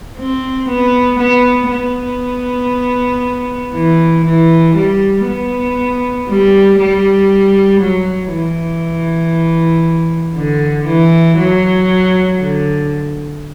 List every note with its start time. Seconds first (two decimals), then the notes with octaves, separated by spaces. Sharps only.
0.17 C4
0.69 B3
1.19 B3
1.70 B3
3.74 E3
4.25 E3
4.76 G3
5.27 B3
6.29 G3
6.79 G3
7.81 F#3
8.32 E3
10.36 D3
10.87 E3
11.37 F#3
12.39 D3